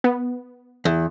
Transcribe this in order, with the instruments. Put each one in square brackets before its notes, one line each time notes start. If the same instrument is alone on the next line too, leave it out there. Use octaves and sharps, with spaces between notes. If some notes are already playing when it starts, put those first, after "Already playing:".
[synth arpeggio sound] B3
[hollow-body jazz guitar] E2